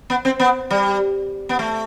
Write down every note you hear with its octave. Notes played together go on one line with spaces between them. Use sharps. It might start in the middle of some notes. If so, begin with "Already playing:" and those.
B3
C4
B3
G3
B3
A3